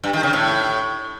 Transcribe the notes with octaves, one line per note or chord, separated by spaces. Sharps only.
G2
D#3
C#3
A2